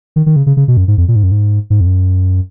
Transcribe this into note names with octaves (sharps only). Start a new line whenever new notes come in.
D#3
D#3
C#3
C#3
C#3
B2
F#2
G#2
F2
A#2
G#2
F#2
G#2
G#2
F2
F#2